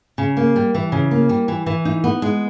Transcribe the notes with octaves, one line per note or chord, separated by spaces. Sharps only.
C#3
A#3
G3
E3
C#3
A#3
G3
E3
E3
D#4
B3
G#3